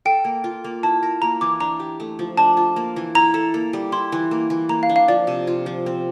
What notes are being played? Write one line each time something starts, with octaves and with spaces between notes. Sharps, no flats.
A4 G5
A#3
F4
A#3
E4 A5
A#4
A#3 A#5
E3 D6
D4 A#5
G4
A3
F3
D4 A5
F4
A#3
E3
E4 A#5
A4
A#3
G3
E4 C6
E3
A#3
E3
A#3 A#5
F5
D4
F5
F3 D5
C3
F4
F3
C4